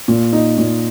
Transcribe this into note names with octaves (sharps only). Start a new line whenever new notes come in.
A#2
D#4
A#2